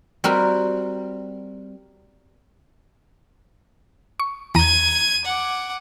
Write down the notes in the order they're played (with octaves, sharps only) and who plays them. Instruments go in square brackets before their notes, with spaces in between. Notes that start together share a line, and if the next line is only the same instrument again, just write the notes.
[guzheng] G3 C4 F#4 A#4 B5
[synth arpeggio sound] C#6
[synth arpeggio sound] E2 A#5 [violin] G#6 D#7
[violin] F#5 D6